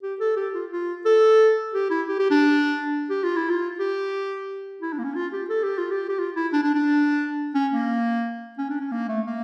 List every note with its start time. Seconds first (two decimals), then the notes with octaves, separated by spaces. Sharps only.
0.03 G4
0.20 A4
0.37 G4
0.54 F4
0.71 F4
1.06 A4
1.74 G4
1.90 E4
2.08 G4
2.19 G4
2.31 D4
3.10 G4
3.24 F4
3.36 E4
3.50 F4
3.79 G4
4.82 E4
4.93 D4
4.99 A#3
5.04 C#4
5.15 F4
5.32 G4
5.50 A4
5.64 G4
5.78 F4
5.91 G4
6.09 G4
6.19 F4
6.36 E4
6.53 D4
6.63 D4
6.75 D4
7.55 C#4
7.72 A#3
8.58 C#4
8.70 D4
8.81 C#4
8.92 A#3
9.09 A3
9.27 A#3